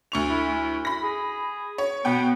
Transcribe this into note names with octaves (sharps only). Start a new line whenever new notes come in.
D2 C#6 F7
E4
B5 A#6
G#4
C#5
B2 B3 G5